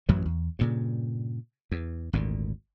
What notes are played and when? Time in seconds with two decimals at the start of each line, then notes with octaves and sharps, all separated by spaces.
0.09 A1 F#2 E3 F#3
0.26 E2
0.59 G2 A#2 C#3
1.72 E2
2.13 G#1 D2 A#2